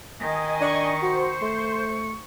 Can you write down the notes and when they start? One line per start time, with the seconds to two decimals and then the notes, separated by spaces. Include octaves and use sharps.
0.19 D#3 D#5 G#5
0.61 D4 C#6
1.02 F#4 C5
1.42 A3